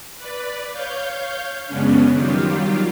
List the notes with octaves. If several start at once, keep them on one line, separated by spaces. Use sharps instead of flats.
B4 D5
C#5 F5 G6
F#2 C#3 G#3 B3 C#4 D4
D#3 F#3 G3 F4 G4